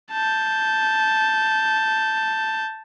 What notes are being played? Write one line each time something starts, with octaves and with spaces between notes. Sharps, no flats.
A5 G6